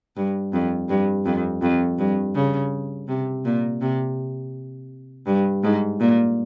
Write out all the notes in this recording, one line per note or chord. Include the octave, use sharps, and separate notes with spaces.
G2
F2
G2
F2
F2
G2
C#3
C3
A#2
C3
G2
G#2
A#2